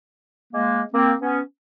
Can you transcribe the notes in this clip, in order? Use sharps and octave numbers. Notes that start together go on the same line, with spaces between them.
G#3 A#3
A#3 C4
B3 C#4